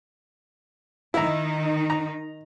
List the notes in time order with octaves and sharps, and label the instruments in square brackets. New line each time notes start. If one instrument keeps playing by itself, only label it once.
[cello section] D#3 D#4 [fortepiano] E4 A#5
[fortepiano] A#5